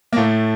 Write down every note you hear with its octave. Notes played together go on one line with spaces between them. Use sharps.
A#3
A2 A3